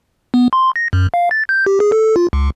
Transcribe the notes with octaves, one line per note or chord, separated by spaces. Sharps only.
B3
C6
A#6
F#2
F5
A6
G6
G4
G#4
A4
F4
C#2